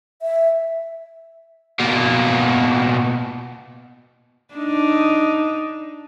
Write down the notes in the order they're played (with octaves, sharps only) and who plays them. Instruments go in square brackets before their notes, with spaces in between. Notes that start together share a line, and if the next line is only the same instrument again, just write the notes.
[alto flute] E5
[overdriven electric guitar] B2 A#3
[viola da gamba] D4 D#4